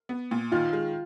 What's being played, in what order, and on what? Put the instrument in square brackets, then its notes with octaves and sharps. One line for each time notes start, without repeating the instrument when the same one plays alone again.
[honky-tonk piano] B3
A#2
[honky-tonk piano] D#3 [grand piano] F4
[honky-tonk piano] G#3